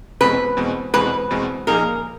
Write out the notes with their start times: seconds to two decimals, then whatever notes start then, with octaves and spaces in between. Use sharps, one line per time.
0.21 E2 B2 G#3 C4 B4
0.57 E2 B2 G#3 C4
0.94 E2 B2 G#3 C4 B4
1.31 E2 B2 G#3 C4
1.67 A#2 F3 A#3 D#4 G#4 A#4